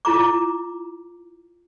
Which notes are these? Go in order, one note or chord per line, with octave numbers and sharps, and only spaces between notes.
E4 F4 A#5 D6